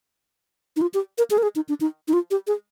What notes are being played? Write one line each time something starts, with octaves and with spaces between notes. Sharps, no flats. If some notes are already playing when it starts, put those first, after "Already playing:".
D#4
F4
G4
A#4
G#4
A#4
G#4
D#4
D4
D#4
D#4
F4
G4
G#4